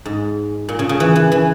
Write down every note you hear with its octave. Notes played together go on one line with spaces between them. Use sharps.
G#2
A#2
C#3
C#3
E3
E3
E3